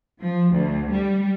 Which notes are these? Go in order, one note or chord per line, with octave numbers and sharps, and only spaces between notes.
F3
D2
G3